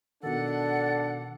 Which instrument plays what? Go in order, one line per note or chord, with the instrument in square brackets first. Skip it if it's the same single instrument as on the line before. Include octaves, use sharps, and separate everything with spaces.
[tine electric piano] B2 D#3 [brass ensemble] D4 [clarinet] A4 [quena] F#5